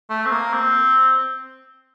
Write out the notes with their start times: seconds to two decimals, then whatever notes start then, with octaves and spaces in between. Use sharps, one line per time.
0.09 A3
0.25 C4
0.31 A#3
0.53 C4